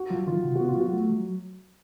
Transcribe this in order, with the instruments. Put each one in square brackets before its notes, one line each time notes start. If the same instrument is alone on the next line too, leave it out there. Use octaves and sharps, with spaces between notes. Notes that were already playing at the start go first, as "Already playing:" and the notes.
Already playing: [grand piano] F#4
[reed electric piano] F#3 [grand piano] F4
[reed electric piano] D#3 [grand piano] F4
[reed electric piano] C3
[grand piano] F#4
[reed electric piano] B3
[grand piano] F4
[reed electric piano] F#3 [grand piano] F#4
[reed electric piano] A3
F#3